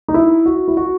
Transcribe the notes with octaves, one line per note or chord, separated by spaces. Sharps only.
D#4
E4
F#4
E4
F#4